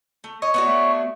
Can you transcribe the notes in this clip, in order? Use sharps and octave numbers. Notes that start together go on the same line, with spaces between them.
A3
C#5 D#5
B3 D4 F#4
A3